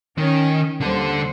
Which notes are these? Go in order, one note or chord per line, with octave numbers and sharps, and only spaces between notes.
D#3 C#4
D#2 D3 G3 A4 C5